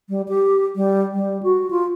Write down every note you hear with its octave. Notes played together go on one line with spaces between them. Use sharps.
G3
G4
G3
G3
F#4
F4